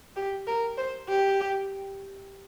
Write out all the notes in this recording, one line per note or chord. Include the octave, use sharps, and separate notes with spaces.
G4
A#4
C5
G4